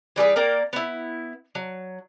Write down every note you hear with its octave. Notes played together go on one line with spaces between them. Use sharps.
E3 G3 G#4 B4
A#3 A#4 D5 G5
B3 E4
F#3